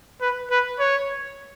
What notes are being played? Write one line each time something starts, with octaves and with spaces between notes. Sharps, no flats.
B4
B4
C#5